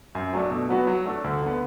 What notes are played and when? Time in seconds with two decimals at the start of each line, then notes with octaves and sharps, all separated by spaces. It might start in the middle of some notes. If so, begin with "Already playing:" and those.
0.15 F#2
0.33 F#3 A3 D4
0.50 B2
0.69 F#3 B3 F#4
0.87 F#3
1.05 A3 D4 A4 D5
1.24 D2
1.42 D3 B3